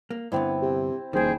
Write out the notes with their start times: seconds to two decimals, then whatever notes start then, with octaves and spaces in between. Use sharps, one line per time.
0.10 A#3
0.32 G2 D3 B3 C4 E4
0.62 C3
1.13 D#1 F2 D#3 G#4 C5 G5